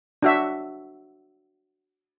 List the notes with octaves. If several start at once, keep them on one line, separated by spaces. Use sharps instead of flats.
D4 F#4 E5